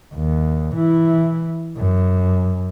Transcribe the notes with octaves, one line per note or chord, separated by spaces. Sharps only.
D#2
E3 E4
F#2